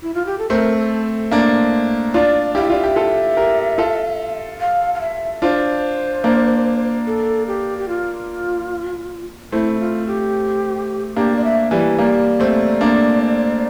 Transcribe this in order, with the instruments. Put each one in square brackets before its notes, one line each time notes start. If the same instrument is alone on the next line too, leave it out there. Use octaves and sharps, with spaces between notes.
[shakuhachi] E4
F4
G4
A4
[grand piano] A3 C4 [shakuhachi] A#4
[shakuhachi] A4
[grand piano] A#3 D4
[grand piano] D4 F4 [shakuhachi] D5
[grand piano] E4 G4 [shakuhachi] F5
[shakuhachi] E5
[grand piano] F4 [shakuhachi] D5
[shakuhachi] E5
[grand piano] G4
F4 A4
G4 A#4
F4 A4
[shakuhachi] F5
F5
E5
[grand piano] D4 F4 [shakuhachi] C5
[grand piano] A#3 D4
[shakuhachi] A4
G4
G4
F4
[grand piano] A3 C4 [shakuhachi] E4
[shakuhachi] F4
G4
[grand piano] A#3 D4 [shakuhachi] G4
[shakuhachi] D5
E5
[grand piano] E3 G3 [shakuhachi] D5
[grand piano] G3 A#3 [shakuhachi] D5
[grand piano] A3 C4
A#3 D4